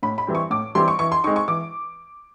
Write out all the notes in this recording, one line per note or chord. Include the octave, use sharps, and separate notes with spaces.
A2 B5
B5
E3 G3 C4
C#6
A2 D6
E3 G3 C4 C6
C#6
E3 C#6
C6
G#3 C4 D#4 C#6
C#6
E3 D6